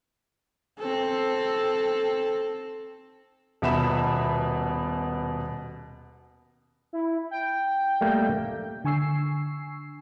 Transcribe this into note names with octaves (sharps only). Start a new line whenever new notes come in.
C4 A4
D#1 B2 E5 B5 E7
E4
G5
G3 A3 A#3
D3 G#5 C#6 E6 C7